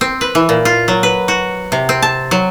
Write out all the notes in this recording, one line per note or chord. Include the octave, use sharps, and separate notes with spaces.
C4
B4
E3
A#2
F4
F#3
B4
F#4
C3
C4
A5
F#3